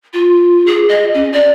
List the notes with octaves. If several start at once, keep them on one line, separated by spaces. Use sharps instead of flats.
F4
G#4
D#5
C#4
D5